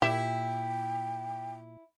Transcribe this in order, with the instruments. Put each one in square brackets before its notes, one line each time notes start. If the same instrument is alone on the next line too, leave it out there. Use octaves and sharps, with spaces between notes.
[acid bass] A#2 [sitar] E4 E5 [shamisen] G4 [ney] G5